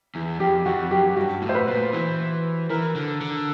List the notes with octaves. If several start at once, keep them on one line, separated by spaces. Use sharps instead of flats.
E2
F2 G4
F2 F#4
F#2 G4
G2 F#4
A2
C5
B4
A#2
E3
E3 A#4
D3
D3